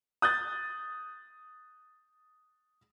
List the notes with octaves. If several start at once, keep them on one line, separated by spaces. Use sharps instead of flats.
D#6 F#6 G6 A6